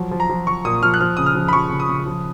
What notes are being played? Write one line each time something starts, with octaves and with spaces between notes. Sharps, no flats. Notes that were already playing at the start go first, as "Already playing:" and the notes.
Already playing: F3 F#3
F3
A#5
F3
F3 C#6
A#2 D#6
F3 F6
F#6
F3 F6
C#3 D#6
F6
F3
B5
F3 C#6
C#3
D#6
C#3
F3